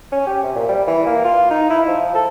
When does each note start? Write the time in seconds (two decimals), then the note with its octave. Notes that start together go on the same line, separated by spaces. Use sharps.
0.12 C#4
0.27 G4
0.43 C3
0.55 A#2
0.69 G3
0.87 E3
1.06 A#3
1.24 F4
1.50 D#4
1.70 E4
1.88 F3
2.14 A4